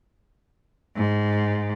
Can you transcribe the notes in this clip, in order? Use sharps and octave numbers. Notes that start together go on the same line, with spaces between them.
G#2